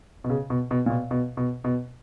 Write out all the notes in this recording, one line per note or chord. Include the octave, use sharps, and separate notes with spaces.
B2
C#3
B2
B2
A#2
B2
B2
B2
B2